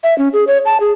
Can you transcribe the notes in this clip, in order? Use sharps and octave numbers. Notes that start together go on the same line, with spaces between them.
E5
C#4
G#4
C#5
A5
G#4